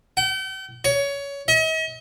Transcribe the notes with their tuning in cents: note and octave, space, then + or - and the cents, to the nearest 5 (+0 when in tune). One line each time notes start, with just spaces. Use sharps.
G5 -40
C#5 +20
D#5 +45